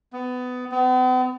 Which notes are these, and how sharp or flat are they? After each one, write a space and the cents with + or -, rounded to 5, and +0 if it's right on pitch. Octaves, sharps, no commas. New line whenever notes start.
B3 +20
B3 +45